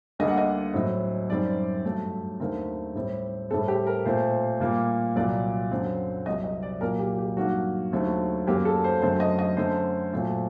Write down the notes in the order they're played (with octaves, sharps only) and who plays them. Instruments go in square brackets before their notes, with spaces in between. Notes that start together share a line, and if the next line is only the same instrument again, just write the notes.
[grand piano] D2 D3 G3 A#3 D#5
F#5
D#5
A2 F#3 C4
F#2 D#3 G3 C4 D5
G2 F#3 A3
D#2 D3 A3 C4 A#4
A2 G3 C4
A2 G3 C4 A4
G4
A#4
A#2 A3 C4 C5
A#2 G3 A#3
C2 A#2 F#3 D5
F#2 D3 F#3 C4
C2 C3 F#3 D#5
D#5
D5
A#2 F#3 A#3 A#4
G4
G4
G2 D#3 F#3 A#3 F#4
D#2 D3 F#3 A3 C4
F#2 F#3 A#3 G4
A4
C5
F#2 D3 F#3 A3 C4 C5
D#5
D#5
F#2 D3 A3 C5
A#2 F#3 A3 C4